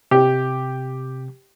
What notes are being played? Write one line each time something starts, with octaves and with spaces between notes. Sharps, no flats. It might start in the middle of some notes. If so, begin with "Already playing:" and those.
C3 G4